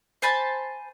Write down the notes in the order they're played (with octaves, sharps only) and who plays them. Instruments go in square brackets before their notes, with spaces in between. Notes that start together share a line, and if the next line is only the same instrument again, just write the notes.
[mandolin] C5 G#5 A5 B5